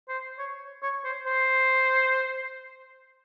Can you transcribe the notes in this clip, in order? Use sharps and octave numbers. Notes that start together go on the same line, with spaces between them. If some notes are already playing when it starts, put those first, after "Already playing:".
C5
C#5
C#5
C5
C5